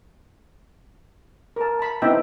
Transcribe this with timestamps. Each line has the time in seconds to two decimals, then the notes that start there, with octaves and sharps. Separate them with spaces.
1.56 A#4 A5
1.79 A5 B5
2.02 B3 C4 D#4 E4 E5 G5